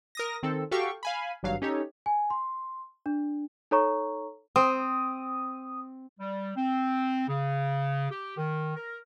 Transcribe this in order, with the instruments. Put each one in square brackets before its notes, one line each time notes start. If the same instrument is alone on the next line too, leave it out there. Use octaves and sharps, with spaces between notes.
[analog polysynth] A#4 D#6 A#6
D#3 C4 A4
F#4 G4 A4 F5 G5 C#6
F5 G#5 B5
G#1 G2 F#3 F5
C#4 D#4 G4 A4 C#5
[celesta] G#5
C6
D4
D#4 A4 C#5 A#5 C#6
[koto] C4 [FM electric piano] D#6
[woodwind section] G3
C4
C#3
G4
D#3
A#4